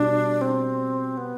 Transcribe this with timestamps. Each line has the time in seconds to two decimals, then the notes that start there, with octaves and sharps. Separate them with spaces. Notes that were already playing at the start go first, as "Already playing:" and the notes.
Already playing: B2 G3 D4
0.41 C4
1.17 B3